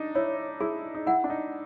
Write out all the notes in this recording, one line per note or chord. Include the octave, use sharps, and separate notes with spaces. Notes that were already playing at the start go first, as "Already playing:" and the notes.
Already playing: D4 D#4
E4 C#5
E4 G#4
D#4
E4 F#5
D4
D#4